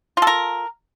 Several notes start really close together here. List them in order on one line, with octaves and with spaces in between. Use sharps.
F4 A4 A#4